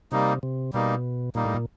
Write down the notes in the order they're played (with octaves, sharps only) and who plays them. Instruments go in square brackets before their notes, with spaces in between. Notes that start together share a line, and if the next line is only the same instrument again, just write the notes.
[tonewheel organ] C3 [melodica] G3 A#3 D#4
[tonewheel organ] C3
[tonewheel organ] B2 [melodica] G3 A#3 D#4
[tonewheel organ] A#2 [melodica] G3 A#3 D#4
[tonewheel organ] A2
A#2